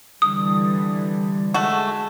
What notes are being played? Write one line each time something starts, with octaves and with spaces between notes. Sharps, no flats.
D3 E3 G3 D#6
G#3 A3 F#4